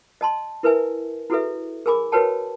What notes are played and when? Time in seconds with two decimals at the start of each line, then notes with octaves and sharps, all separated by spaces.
0.21 D#5 A5 C6
0.63 E4 A#4 B4 E5 G#5
1.30 E4 F#4 G#4 A4 B4 E5
1.86 G#4 A#4 G#5 B5 D6
2.12 F#4 A#4 B4 C#5 G5 A5